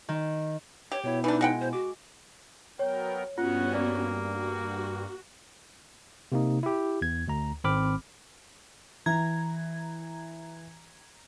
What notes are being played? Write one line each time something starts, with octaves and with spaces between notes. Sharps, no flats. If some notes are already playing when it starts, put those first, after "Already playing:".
D#3
G4 C#5
B2 B3 E4 C#5
E3 D4 D#4
G#3 F#5 G5
C5
F#4 D6
F#3 B3 A#4 C#5 G5
G2 B3 C#4 F4 F#4 F#5
A#3 D5
F#4
C3 A#3 D#4
E4 G4
E2 G#6
D2 A#5
G#1 C4 B5 D6 F6
E3 A#5 G#6